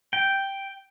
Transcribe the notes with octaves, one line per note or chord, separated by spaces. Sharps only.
G5